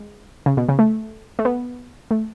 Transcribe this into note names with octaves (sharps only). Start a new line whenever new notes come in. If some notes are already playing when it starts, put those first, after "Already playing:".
Already playing: G#3
C#3
B2
C#3
A3
A3
B3
A3